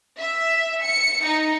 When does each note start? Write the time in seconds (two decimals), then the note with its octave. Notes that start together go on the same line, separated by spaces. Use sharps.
0.19 E5
0.83 C#7
1.26 D#4